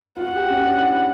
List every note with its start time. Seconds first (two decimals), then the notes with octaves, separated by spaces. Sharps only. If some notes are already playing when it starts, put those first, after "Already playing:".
0.17 F4
0.21 F#4 F#5
0.36 G4
0.50 C#4
0.65 D4
0.80 E4